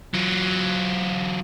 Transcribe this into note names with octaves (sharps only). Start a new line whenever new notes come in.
F#3 F4